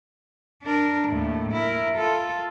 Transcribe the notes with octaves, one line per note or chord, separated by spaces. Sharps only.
D4 A#4
D#2 A2
E4 A#4
F4 A4